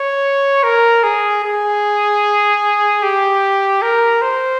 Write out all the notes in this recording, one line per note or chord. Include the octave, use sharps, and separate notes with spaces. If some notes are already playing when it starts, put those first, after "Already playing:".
Already playing: C#5
A#4
G#4
G#4
G4
A#4
C5